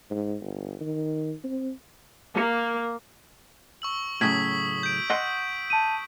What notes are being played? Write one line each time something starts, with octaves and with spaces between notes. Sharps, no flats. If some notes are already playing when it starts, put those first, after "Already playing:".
G#2
G1
D#3
C4
A#3
C#6 E6 F#7
A2 C#3 F#3 D#6 G#6 B6 F#7
G6 D7
D#5 F#5 C6
A5 D#7